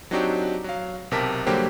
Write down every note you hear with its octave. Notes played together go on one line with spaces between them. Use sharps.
F#3 C4 D4 D#4 F#4 G4
F#3 F5
B1 C3 G4 A#4 A5 B6
D3 F#3 G3 A#3 G4 C5